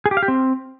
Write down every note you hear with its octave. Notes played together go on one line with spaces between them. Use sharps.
G#4
G4
F5
G4
C4